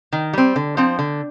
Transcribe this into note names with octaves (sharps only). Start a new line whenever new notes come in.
D#3
G3 C4
D3
F3 C4
D3